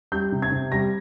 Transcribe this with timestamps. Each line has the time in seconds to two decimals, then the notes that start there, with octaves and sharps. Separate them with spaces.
0.12 G3 G6
0.32 C3
0.42 G#6
0.51 C3
0.72 G3 A#6